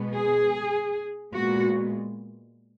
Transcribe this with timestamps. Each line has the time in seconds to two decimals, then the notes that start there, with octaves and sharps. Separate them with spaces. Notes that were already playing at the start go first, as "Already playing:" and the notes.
Already playing: B2 G#3 B3
0.14 G#4
1.32 A#2 G#3 B3 F#4